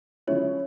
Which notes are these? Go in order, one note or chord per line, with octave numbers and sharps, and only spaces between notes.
C#3 F3 G#3 C#4 E4 C#5